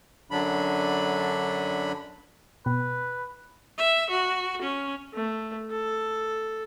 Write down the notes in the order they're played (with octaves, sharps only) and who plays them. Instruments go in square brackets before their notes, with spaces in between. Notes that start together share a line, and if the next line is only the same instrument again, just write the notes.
[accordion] F#2 D3 F#3 D4 B5
[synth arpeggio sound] B2 [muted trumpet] B4
[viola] E5
F#4
C#4
[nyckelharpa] A3
A4